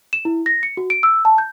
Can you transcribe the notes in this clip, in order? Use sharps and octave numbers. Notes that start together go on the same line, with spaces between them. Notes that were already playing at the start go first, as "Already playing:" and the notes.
E7
E4
A#6
C#7
F#4
D7
E6
A5
G6